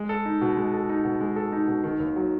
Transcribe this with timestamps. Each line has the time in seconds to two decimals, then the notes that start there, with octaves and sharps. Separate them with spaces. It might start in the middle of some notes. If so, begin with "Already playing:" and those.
Already playing: G#3
0.09 A4
0.25 D#4
0.41 B2
0.57 G#3
0.73 A4
0.89 D#4
1.05 B2
1.20 G#3
1.36 A4
1.52 D#4
1.68 B2
1.84 D#3
2.00 D#2
2.16 F#3